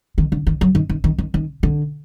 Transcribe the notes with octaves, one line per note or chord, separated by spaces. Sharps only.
D#3
D3
D#3
F#3
D#3
D#3
D#3
D#3
D#3
D3